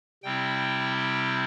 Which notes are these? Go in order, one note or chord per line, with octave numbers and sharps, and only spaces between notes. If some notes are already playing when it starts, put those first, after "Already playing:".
C3 G3 C4 E4 G5
G5